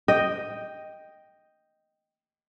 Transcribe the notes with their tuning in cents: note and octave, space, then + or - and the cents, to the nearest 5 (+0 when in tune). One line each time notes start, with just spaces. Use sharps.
D#5 +0 G5 +0